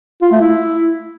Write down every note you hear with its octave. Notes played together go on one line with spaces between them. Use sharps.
F4
A3
E4